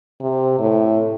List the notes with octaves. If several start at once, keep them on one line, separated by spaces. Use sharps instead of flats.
C3
A2